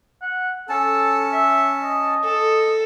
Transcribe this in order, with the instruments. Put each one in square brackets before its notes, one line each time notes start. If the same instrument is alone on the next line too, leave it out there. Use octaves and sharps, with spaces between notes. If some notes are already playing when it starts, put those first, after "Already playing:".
[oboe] F#5
[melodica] C#4 A5 [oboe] A4
[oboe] E5
D#5
[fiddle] A4